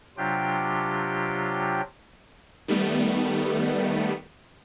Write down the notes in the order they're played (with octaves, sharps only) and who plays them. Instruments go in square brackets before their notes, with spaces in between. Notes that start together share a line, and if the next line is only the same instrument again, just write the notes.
[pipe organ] C3 F#3 D4 F4 G4 G5
[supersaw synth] D#3 G3 A3 B3